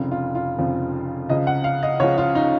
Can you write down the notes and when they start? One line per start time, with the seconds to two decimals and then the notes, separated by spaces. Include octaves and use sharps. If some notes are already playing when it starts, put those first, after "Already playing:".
Already playing: F1 F2 C#3 F3
0.11 F4
0.35 F4
0.58 F1 F2 C#3 F3
1.29 C#2 C#3 F3 D#5
1.47 F#5
1.64 F5
1.83 D#5
2.00 C#2 C#3 F3 C#5
2.18 F4
2.35 D#4